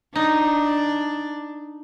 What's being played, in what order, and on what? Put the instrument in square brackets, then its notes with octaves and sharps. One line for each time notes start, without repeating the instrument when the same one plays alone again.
[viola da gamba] D4 [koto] D#4